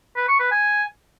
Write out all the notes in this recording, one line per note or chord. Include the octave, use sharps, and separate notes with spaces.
B4
C#6
B4
G#5